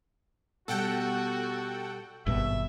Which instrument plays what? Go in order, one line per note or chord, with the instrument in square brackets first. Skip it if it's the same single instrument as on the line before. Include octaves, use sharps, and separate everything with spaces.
[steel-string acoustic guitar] B2 G3 [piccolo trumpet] F#4 [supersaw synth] A4 F#5 G5
[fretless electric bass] G#1 G2 B2 [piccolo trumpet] E5